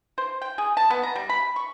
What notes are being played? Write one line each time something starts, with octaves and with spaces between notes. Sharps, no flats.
C5
G5
G#4
A5
B3
A#5
G3
B5
C#6